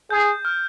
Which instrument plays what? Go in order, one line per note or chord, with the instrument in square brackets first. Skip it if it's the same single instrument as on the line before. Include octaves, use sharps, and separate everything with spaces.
[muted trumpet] G#4 [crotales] G6
[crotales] F6